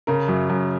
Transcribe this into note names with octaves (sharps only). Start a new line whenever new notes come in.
C#3 A#4
F#2
F#2